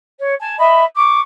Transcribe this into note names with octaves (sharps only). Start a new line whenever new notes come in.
C#5
G#5 A5
D#5 E5 B5
C#6 D6